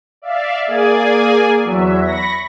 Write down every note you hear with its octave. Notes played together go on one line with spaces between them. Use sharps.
D5 E5 F5
A#3 G#4 D5 G#5
E2 F#3 E5
B5 C#6 A#6